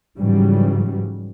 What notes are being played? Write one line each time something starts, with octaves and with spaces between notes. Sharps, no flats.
G#2 C#3 E3 F#3 G3